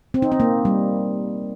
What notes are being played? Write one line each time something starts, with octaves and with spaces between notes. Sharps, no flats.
C4
D#4
C4
A#3
G3